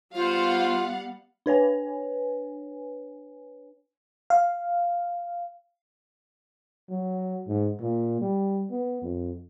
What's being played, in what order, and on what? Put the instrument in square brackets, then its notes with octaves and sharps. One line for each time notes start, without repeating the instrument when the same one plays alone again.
[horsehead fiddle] G3 B3 [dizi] F4 [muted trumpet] C5 [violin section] F5 F#5
[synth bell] D4 B4 C#5 G#5
[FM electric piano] F5
[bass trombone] F#3
G#2
A#2
G3
B3
F2